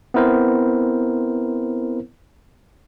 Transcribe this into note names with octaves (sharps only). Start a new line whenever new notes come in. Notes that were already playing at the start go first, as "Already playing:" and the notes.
B3 C4 E4 A#4 C5